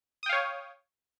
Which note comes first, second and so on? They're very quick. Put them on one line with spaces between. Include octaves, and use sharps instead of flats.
D#6 G5 F5 C#5